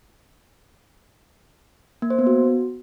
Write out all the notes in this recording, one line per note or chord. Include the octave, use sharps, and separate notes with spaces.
A#3
C5
B3
F#4